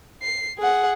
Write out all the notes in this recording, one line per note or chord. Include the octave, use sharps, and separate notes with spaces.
C7
G#4 F#5